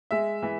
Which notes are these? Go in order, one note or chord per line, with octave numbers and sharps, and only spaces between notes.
G#3 E5
E3